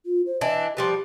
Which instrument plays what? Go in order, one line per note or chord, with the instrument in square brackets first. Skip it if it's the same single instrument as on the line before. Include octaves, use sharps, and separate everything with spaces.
[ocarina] F4
C5
[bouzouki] E3 D4 [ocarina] D#5
[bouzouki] F3 G3 B4 [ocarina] G4